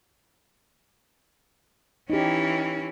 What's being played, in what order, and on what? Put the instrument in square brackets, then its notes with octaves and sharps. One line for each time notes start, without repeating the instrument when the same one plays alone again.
[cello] E3 C#4 [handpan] D#4 G4